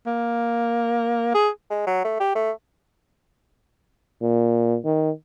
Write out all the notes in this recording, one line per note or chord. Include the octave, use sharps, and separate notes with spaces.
A#3
G#4
G#3
F#3
A3
G4
A3
A#2
D#3